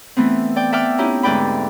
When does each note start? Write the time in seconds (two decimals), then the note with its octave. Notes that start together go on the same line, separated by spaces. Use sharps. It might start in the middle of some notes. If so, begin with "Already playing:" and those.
0.17 E3 A3 B3 C4
0.56 D5 G5
0.73 E5 F#5 G5 A5 D6 F6
0.98 C#4 D#4 E4 G4
1.23 D2 G#2 B4 D5 G5 B5